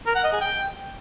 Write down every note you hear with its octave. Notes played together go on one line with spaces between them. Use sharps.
A#4
F#5
D#5
G#4
G5